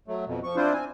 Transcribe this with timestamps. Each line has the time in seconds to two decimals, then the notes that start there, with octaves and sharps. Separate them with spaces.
0.08 F#3 A3
0.27 F2 B2
0.44 F3 C#6
0.56 C4 D4 E4 F4 C5
0.73 C4 G#5